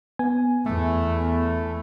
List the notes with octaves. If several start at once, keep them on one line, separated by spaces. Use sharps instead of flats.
B3 G#5
E2 A3